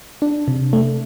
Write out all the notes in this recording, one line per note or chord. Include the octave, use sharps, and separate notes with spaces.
D4
C3
A3